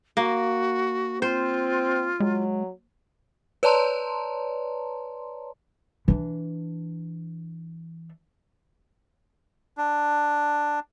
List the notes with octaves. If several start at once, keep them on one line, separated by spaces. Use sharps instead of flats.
A#3 F#4
C4 F4 C5
F#3 G#3
B4 C#5 D5 A5 A#5 C6
E3 D4
D4